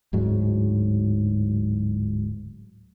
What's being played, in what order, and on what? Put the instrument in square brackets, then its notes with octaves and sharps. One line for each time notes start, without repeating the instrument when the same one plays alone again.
[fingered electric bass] D1 G#2 F#3